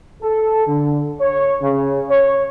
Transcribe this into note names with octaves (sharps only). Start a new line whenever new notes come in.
A4
D3
C#5
C#3
C#5